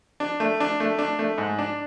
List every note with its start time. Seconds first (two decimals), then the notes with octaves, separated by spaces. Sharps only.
0.20 D4
0.40 A3
0.60 D4
0.80 A3
0.99 D4
1.19 A3
1.38 G#2
1.59 D4